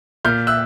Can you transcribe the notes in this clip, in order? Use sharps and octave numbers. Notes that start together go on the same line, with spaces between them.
A#2 F6 G6
E6 F#6